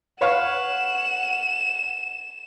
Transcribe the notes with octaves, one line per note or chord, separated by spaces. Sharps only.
B4 C#5 F5 F#5 E7